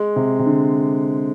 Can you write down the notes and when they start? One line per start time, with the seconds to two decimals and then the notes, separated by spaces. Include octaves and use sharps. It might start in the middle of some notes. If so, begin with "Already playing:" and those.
Already playing: G#3
0.16 C3
0.39 C3
0.46 D3